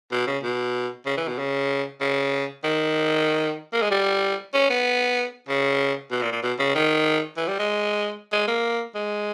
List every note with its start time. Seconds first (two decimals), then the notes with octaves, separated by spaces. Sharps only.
0.11 B2
0.27 C#3
0.43 B2
1.06 C#3
1.17 E3
1.28 B2
1.38 C#3
2.01 C#3
2.64 D#3
3.73 A#3
3.81 G#3
3.91 G3
4.54 C#4
4.70 B3
5.49 C#3
6.11 B2
6.22 A#2
6.32 A#2
6.43 B2
6.59 C#3
6.75 D#3
7.37 E3
7.48 G3
7.59 G#3
8.33 G#3
8.48 A#3
8.95 G#3